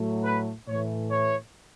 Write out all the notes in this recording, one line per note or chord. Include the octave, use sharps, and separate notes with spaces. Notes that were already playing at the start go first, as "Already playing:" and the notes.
Already playing: A2 F#3 A3
B4
A2 E3 A3 C#5
C#5